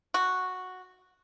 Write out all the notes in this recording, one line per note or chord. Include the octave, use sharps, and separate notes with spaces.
F#4